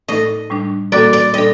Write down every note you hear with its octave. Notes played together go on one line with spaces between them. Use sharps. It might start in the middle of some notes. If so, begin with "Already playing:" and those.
A2 A3 D#4 A4 D#5
A2 G3 D4
A#2 G3 A#3 F#4 A4 D5
D5
A#2 G3 D4 A4 D#5